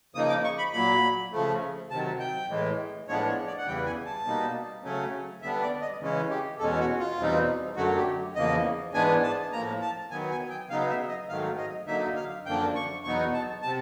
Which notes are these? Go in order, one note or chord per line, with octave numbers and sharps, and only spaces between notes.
C#3 F3 A#3 D#4 D#6
D6
C#6
B5
A#2 F#3 A#3 B5
C#3 F3 A3
C3 D#3 F#3 A5
G5
A2 E3 G#3
A2 F3 G#3 B3 D4 C#5
C#5
D5
F#5
E2 C#3 E3 G3 G5
G#5
A5
B2 G3 A#3 D#4
C#3 F#3 A3 C#4
D3 G3 B3 D4 E5
D5
D#5
C#3 E3 G#3 C#4
G4
E2 B2 G#3 C#4 A4
F#4
F4
E2 B2 G3 C4 D#4
F#2 D3 F#3 A3 F#4
G4
E2 C#3 F3 A#3 D#5
G#2 E3 G#3 B3 D4 G#5
A5
A2 F3 A#3 A#5
A5
D#3 F#3 B3 G#5
G#5
G5
C#3 F#3 B3 D#4 F5
E5
D#5
G#2 D#3 F#3 A3 F5
D#5
D3 F#3 A#3 D#4 E5
F5
F#2 D3 F3 A#3 D4 G5
C#6
E2 B2 F#3 B3 D#4 C#6
A5
C3 A5